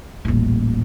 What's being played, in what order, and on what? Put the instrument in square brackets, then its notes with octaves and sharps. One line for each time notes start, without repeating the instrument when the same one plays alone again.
[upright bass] D#1 A1